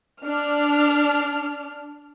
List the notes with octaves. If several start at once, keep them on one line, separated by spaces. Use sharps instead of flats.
D4 F6